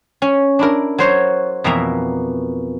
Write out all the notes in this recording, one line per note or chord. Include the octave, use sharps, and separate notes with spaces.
C#4
D4 E4 A#4
F#3 C5 C#5
F2 B2 E3 A#3 E5 A#5